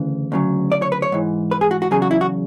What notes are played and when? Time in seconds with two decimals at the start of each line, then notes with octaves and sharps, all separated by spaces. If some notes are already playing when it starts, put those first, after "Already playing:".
Already playing: D2 C#3 E3
0.32 D2 C#3 F#3
0.72 D5
0.82 C#5
0.92 B4
1.02 C#5
1.12 G#2 E3
1.51 B4
1.61 G#4
1.71 F#4
1.82 F#4
1.91 E2 C#3 F#3 G#4
2.02 F#4
2.11 E4
2.21 F#4